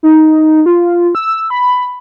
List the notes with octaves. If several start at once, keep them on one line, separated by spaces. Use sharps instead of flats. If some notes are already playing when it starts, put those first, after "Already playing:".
D#4
F4
E6
B5